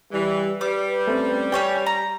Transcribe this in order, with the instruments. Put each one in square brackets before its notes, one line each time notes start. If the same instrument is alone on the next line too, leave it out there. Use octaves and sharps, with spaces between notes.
[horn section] E3 [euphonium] G3
[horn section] G3 [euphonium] B4 [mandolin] D6
[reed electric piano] A3 C4 C#4
[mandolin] C#4 C#5 G5 [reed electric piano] G4
[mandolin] A#5